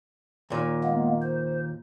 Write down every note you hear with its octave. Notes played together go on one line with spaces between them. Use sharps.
D#2 A#2
G#3 A#3 B3
C5